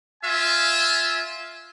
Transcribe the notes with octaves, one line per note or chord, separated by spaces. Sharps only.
F4 E5 G#5